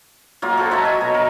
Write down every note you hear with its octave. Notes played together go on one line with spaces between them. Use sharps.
F#3 A#3 F4
F#4 A4 C5
C#5 D#5 E5 A#5
G#5
B2
A#4